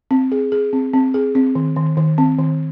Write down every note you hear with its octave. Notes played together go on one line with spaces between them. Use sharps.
C4
G#4
G#4
C4
C4
G#4
C4
D#3
D#3
D#3
C4
D#3